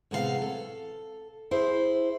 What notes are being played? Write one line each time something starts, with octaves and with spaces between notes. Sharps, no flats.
A2 C3 G#3 B3 A4 F5
A4
E4 G#4 C5